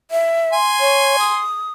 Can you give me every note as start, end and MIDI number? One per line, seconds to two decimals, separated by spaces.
0.11 0.54 76
0.53 1.43 80
0.53 1.43 84
0.80 1.17 73
1.19 1.73 87